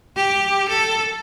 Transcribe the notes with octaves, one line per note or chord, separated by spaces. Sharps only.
G4
A4